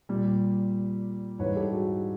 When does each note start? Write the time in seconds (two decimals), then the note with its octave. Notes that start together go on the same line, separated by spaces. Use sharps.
0.09 A#2 G3
1.39 G#2 E3 G3 B4 C#5
1.56 G4 A4
1.72 F#4 G#4